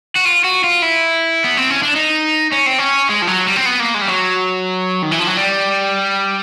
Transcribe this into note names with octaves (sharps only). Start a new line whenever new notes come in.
F#4
F4
F#4
F4
E4
B3
C4
C#4
D4
D#4
C#4
C4
C#4
G#3
F3
F#3
G3
C4
B3
A#3
G#3
G3
F#3
D#3
E3
F3
F#3
G3